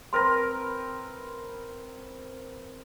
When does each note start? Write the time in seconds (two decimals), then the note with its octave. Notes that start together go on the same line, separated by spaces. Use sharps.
0.13 C4 A#4 B4 C6 A#6